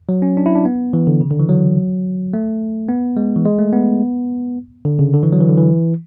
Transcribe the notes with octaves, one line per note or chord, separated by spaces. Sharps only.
F#3
C#4
D4
E4
D4
B3
E3
D3
C#3
D3
E3
F#3
A3
B3
G#3
E3
G#3
A3
B3
D3
C#3
D3
E3
F#3
E3
D3
E3